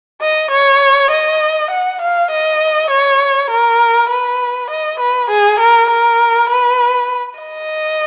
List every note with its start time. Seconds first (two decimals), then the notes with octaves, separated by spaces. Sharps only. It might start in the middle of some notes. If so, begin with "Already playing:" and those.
0.21 D#5
0.51 C#5
1.11 D#5
1.71 F#5
2.01 F5
2.31 D#5
2.90 C#5
3.50 A#4
4.10 B4
4.70 D#5
5.00 B4
5.30 G#4
5.60 A#4
5.90 A#4
6.50 B4
7.39 D#5